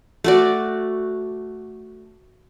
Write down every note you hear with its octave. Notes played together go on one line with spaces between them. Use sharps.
A3 F#4 D5